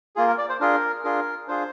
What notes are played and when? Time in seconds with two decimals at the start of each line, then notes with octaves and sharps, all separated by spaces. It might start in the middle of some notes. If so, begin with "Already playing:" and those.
0.16 A#3 F4 G#4
0.28 A#4
0.38 D5
0.49 C5
0.60 D4 F4 G#4 A#4
1.04 D4 F4 G#4 A#4
1.48 D4 F4 G#4 C5